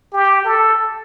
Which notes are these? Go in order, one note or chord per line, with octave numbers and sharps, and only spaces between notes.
G4
A4